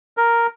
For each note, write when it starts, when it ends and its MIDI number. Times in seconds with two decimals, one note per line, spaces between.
0.17 0.47 70